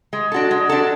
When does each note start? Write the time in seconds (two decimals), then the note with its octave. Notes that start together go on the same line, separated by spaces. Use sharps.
0.13 G#3
0.32 D4 F#4 A4
0.51 G#3
0.69 D4 F#4 A4